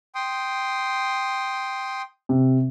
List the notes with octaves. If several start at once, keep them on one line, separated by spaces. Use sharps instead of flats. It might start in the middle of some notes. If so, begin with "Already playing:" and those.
G5 C6 D#6
C3